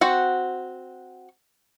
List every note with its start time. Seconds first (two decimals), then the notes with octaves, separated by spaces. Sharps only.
0.01 C4 F#4 F#5